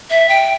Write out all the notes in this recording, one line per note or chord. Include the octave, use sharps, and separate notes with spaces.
E5
G5